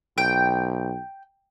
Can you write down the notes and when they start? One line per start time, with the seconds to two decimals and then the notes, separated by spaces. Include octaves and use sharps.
0.18 B1 G5